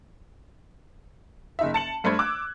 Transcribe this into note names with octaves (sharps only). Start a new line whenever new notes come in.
F#1 D#4 E5
A5 C#7 F#7
G2 A3 D4 C5 B5 G#6
D6 E6 F#6